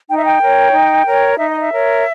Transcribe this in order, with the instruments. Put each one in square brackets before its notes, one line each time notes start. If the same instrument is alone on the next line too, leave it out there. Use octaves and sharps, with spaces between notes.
[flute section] D#4 G5
E5
G5
A#4 C#5
D#4
A#4 C#5
D#4 E5
D#5
E5
A#4 C#5